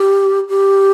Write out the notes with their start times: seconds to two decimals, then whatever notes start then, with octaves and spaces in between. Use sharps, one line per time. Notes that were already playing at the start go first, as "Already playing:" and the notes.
Already playing: G4
0.49 G4